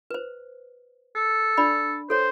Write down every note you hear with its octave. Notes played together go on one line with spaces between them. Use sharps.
B4 C5
A4
D4 D5 B5
A4 C5 C#5